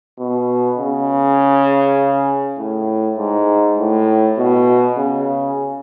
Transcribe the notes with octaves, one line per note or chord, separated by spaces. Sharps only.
B2
C#3
A2
G#2
A2
B2
C#3